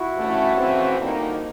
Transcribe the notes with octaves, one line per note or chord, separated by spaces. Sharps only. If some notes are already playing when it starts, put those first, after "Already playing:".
Already playing: E4 F#4
G2 E3 A3 C#4
C#3 E3 A3 C4
F2 D3 G3 A#3 D#4